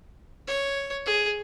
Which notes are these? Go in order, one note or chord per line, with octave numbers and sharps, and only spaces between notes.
C#5
G#4